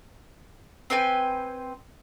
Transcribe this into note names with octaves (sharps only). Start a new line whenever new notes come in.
C4 B4 G5 G#5